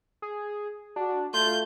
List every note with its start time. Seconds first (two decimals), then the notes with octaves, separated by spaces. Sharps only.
0.22 G#4
0.96 D4 F#4
1.34 A3 F4 G6